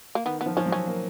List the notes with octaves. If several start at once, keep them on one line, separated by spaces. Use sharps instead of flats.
A#3
D#3 B3
B3
F3
F3 C#4
F#3
C#4
A#3